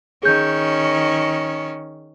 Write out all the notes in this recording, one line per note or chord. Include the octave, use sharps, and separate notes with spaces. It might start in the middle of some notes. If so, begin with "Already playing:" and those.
D#3 C#4 G#4 G6